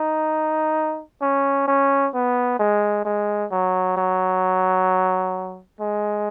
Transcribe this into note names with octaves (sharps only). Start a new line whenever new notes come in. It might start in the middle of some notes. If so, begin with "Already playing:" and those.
Already playing: D#4
C#4
C#4
B3
G#3
G#3
F#3
F#3
G#3